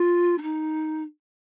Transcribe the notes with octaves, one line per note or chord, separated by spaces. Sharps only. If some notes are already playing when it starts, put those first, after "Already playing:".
Already playing: F4
D4
D#4